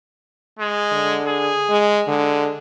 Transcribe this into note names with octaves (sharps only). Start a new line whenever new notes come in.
G#3
D3
G#4
G#3
D3 G#3